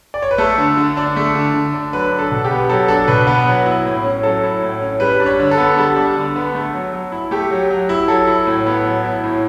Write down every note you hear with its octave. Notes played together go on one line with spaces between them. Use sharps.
D5
C#5
B4
A3 A4
D3
D3
D4
A3
D3
D3
D4
F#3 B4
D4
A4
B2
G4
B3
F#3 A4
D4 A4
B2 B4
B3 B4
F#3
E4
A2
C#4
F#3 A4
E4
A2
C#4
G3 B4
D4
C#5
D3
A4
B3
G3 A4
D4
D3
B3
A3
F#3
F#3
E4
A3 G4
F#3
F#3
E4
F#3 A4
E4
A2
B3
F#3
E4
A2